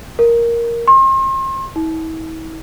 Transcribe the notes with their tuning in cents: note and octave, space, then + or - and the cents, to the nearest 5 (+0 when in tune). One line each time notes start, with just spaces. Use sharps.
A#4 +5
C6 +40
E4 -40